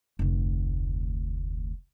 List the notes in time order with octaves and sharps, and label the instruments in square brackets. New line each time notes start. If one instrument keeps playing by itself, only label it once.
[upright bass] F1 D2